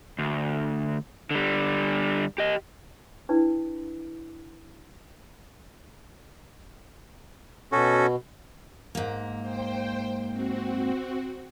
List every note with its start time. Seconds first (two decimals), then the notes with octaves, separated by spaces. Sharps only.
0.19 D2
1.31 D3 G3
2.38 G4 D#5
3.29 D4 E4 B4
7.72 B2 C#4 F#4 A4
8.95 G#2 A#3
9.42 C5 G5
10.31 C4 F#4